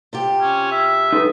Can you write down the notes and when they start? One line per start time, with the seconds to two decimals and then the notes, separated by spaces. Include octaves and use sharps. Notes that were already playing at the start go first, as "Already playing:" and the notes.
0.13 C3 F4 G4
0.41 C#4
0.71 E5
1.13 D#4 A4 B4